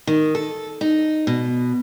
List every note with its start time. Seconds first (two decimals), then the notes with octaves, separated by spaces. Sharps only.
0.07 D#3
0.35 A4
0.81 D#4
1.27 B2